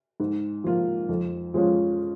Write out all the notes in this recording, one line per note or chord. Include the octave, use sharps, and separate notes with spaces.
G#2
F3 A#3 F4
F2
F3 G#3 C#4 F4